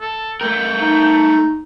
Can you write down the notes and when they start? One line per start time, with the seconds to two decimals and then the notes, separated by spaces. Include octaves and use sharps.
0.01 A4
0.41 A3 A#4 G5
0.81 D#4